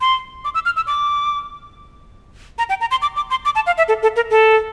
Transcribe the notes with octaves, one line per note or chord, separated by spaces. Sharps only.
C6
D6
E6
F6
E6
D6
A#5
G5
A#5
C6
D6
D6
C6
D6
A5
F5
E5
A4
A4
A#4
A4